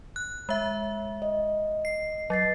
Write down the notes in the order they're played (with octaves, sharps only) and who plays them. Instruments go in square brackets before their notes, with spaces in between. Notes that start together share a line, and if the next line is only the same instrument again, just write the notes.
[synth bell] F#6
G#3 E5
[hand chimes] D#5
[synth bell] C7
[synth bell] F#3 [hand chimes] D#5 A6 C7